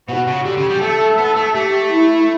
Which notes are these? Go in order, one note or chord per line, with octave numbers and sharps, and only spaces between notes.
B2 F#4
C#3
D3 G4
C#3
G3
A3 A4
B3
A3
A3 G4
E4